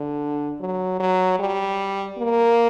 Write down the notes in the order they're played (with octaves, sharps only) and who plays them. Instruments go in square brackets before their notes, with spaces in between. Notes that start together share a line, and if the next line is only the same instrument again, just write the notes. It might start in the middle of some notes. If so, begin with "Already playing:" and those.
Already playing: [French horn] D3
F#3
F#3
G3
A#3